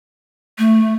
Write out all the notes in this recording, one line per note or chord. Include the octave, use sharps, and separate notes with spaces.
A3